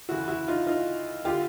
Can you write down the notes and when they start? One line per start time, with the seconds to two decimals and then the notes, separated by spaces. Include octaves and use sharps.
0.09 D2 C#3 E3 E4 F#4
0.28 E4 F#4
0.48 D#4 F4
0.67 D#4 F4
1.25 D3 F4 G4